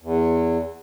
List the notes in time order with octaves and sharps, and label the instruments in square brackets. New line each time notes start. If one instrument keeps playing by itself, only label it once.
[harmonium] E2